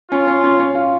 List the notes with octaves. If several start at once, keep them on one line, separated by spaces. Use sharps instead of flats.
C#4 F4
C#4
C#4
C#4
F4